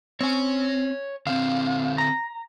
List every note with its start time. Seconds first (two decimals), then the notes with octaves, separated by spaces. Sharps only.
0.21 C4 C#5 G#5
1.27 D3 C4 F5
1.98 A#5